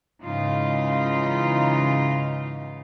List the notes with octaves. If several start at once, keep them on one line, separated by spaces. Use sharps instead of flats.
G#2 C#3 E3 D#4 F4